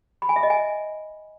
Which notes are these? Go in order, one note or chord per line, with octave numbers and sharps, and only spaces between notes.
B5
G#5
E5
D#5
G#5